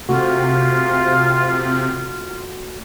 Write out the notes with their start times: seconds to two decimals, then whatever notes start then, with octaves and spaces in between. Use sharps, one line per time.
0.09 C3 A3 F4 F#4